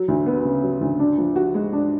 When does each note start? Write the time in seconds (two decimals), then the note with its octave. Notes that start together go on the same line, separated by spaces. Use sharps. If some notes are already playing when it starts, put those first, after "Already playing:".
Already playing: F#3
0.08 D2
0.26 B3
0.45 C#3
0.63 F#3
0.81 D2
0.99 D4
1.18 F3
1.36 F#4
1.54 G#3
1.73 D4